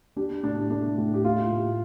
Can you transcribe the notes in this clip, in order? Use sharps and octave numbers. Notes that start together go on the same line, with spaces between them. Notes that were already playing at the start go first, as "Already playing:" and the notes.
D4 G4
A2 D4
A3 D4
A2
G4
A3 F4
A2